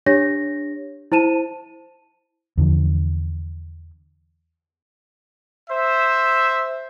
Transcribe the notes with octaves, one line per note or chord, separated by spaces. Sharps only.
D4 G4 C#5 A#6
E4 C5 A5 D#7 E7
E2 D3 F3
C5 E5